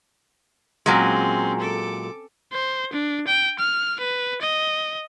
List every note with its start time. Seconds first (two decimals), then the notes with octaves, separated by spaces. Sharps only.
0.86 A#2 F#3 G#3 C4 C#4
1.60 A4 D6
2.52 C5
2.93 D4
3.27 G5
3.59 F6
4.00 B4
4.41 D#5